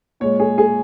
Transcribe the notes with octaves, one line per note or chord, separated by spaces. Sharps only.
A#2 G#3 C#5
G#4
G#4